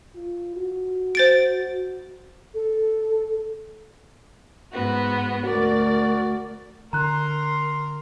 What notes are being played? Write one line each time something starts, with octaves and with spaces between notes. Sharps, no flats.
F4
F#4
C5 A6 D7
A4
G#2 B3 F#4
D2 F#4 A#4 D5
D3 A#4 A#5 C6 F#6